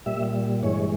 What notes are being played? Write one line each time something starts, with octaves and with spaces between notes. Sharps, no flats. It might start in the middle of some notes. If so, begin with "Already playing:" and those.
A#2 G3 E5
G2 E3 G#3 C#5